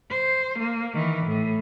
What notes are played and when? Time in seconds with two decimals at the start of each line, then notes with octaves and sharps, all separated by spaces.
0.10 C5
0.58 A#3
0.94 D#3 E3
1.26 A2